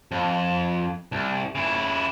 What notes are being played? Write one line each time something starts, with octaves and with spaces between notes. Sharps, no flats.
F2
C2
C#3 E4